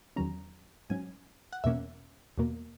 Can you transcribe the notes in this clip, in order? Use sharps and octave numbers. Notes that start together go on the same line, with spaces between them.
E2 D#3 F#3 C#4 A#5
G#2 F#3 C#4 G#5
F#5
E2 B2 A#3 C#4 E5
E2 B2 A#3